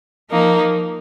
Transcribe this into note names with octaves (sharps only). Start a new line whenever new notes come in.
F3 A#3 D#4